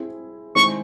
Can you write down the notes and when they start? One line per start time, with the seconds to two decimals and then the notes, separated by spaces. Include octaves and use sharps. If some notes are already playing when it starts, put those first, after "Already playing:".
Already playing: C4 E4 G#4
0.55 D#3 G#3 C4 E4 G#4 C#6